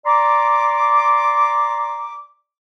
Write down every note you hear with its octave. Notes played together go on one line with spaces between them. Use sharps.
D5 A#5 C6 D6